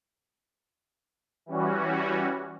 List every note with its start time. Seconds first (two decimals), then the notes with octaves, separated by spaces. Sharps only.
1.46 E3 G3 C#4 F#4